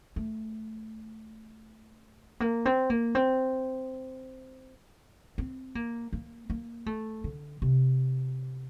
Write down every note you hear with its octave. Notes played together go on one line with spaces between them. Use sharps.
A3
A#3
C4
A#3
C4
C4
A#3
A#3
A#3
A3
D3
C3